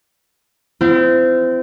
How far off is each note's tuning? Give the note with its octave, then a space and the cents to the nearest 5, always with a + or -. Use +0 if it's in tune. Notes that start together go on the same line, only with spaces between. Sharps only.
C4 -25 E4 +40